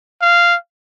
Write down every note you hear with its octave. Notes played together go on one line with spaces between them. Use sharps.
F5